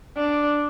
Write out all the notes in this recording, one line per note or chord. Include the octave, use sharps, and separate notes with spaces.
D4